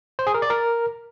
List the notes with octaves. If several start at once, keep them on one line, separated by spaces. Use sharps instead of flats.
C5
G#4
A#4
D5
A#4